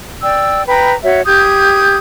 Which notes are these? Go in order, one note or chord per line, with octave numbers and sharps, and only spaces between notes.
D5 G5 E6
B4 G5 A#5 B5
F#4 C#5 E5
G4 D#6 G6 G#6